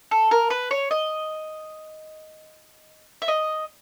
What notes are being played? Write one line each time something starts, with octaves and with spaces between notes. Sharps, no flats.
A4
A#4
B4
C#5
D#5
E5
D#5